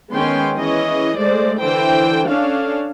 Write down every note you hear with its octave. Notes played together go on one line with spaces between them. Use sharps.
D#3 G#3 B3 C#4 G5 C6
E3 C#4 G#4 D#5
G#3 A3 C5 D5
D3 E3 C5 G5
C#4 D4 A4 F5